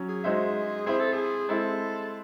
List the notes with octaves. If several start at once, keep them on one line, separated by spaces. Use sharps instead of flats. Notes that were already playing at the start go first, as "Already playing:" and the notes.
Already playing: F#3 C#4
G#4
G#3 D#4 F#4 C5 E5
C4 E4 G#4 C5 E5
A4
G#4
G#3 C4 E4 A4